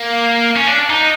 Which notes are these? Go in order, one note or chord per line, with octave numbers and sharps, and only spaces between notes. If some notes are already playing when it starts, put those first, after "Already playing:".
Already playing: A#3
C#4
D4
D#4